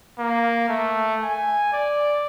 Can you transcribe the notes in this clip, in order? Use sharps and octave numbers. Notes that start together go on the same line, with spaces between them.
A#3
A3
G#5
D5